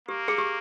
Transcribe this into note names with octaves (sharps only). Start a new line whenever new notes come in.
A#3 G4
G#4
G4